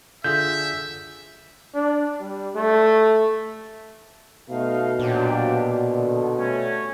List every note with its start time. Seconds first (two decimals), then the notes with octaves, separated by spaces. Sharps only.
0.24 D3 F4 G#4 E5 G6
1.74 D4
2.20 G3
2.55 A3
4.50 B2 A3 D#4 F5
4.99 A#2 F#3 D4 G4
5.87 D3 D#3
6.36 G3 A3 C#4